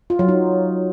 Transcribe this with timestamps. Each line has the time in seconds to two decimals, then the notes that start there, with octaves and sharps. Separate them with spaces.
0.10 F4
0.19 F#3
0.28 D#4